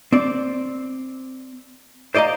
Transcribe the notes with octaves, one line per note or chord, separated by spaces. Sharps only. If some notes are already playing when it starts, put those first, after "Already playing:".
C4 D5
C5 D5 D#5 F5 A#5